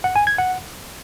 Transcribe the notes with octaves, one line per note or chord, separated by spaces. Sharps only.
F#5
G#5
G#6
F#5